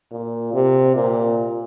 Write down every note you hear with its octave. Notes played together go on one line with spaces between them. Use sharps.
A#2
C3
A#2